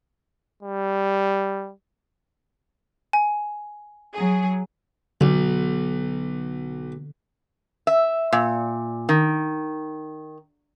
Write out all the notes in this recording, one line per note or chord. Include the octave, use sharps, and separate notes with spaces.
G3
G#5
F#3 G#4
B1 D3
E5
A#2
D#3